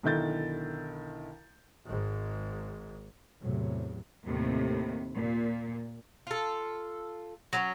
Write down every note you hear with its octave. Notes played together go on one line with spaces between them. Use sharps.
B1 D3 D#3 E4 G6 A6
G#1 G#2
E2 A2 C3 F#3
D#2 A2 C3
A#2
F4 A4
F#3 B3 C#4